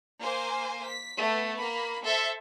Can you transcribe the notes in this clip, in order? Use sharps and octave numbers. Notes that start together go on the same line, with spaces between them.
A#3 C5 G#5
B6
A3 B3
A#3 B5
A4 C5 E5